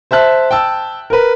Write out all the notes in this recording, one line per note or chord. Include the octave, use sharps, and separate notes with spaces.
C5 E5 A5 F#6
G5 A5 E6
A#4 B4